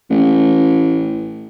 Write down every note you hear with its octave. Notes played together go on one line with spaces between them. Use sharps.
A1